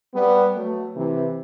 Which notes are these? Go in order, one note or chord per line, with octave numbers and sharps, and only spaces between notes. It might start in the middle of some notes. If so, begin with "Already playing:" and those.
G3 B3
F#3 A3
C3 E3